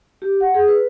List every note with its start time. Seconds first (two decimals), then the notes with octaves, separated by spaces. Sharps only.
0.22 G4
0.41 F#5
0.54 G#4
0.68 B4